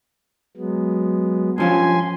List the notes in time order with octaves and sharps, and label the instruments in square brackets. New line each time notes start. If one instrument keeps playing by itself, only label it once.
[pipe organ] F#3 G#3 B3
[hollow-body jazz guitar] G2 F3 C#4 [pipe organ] G#5 C6